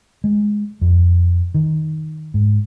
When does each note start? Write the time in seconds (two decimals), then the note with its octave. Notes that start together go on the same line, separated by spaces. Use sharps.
0.24 G#3
0.81 F2
1.54 D#3
2.34 G#2